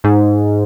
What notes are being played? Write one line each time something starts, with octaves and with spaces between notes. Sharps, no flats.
G#2